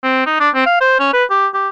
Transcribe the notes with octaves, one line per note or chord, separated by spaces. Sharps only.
C4
D#4
D4
C4
F5
C5
C#4
B4
G4
G4